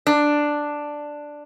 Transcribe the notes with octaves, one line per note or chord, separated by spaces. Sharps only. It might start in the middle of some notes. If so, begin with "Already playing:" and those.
D4